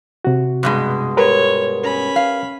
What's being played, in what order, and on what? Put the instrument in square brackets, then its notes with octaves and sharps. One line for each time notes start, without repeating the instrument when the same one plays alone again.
[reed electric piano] C3 F#4
[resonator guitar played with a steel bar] G2 B2 G#3
[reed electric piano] G4 A#4 B4 [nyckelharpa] C#5
[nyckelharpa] C#4 B5
[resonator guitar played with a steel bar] F5